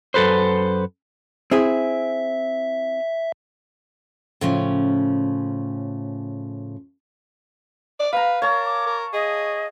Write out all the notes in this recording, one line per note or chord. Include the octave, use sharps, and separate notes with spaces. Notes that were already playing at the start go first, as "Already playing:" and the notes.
F#2 A4 B4 C5
C4 E4 G#4 E5
A2 C#3 F3 C#4
D5
B4 F5 A#5
A#4 C#5 A5
D6
A#4
G#4 D#5